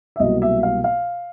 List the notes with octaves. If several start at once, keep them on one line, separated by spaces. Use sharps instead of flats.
E5
C2 B2 F#3 A#3 D#5
E5
F5
F5